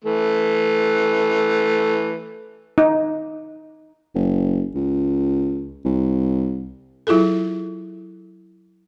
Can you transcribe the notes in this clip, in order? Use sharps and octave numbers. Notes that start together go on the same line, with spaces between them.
E3 A3
D#4
F#1
C#2
C2
F#3 E4 F4 G#4 A4